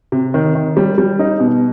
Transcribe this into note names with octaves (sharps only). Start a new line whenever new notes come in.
C3
D#3
D#3
G3
G3
D#4
B2